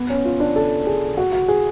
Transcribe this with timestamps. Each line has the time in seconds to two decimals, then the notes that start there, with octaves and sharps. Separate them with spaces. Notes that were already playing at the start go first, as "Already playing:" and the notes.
Already playing: B3
0.10 C#4
0.25 F4
0.40 D4
0.56 A4
0.87 G#4
1.17 F#4
1.32 F#4
1.48 G#4